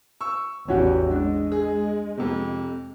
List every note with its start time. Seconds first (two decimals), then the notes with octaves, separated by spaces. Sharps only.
0.21 C#6 E6
0.68 A1 E2 C#4 F#4 G4
1.11 G#3 D4
1.52 G#4
2.17 F2 C3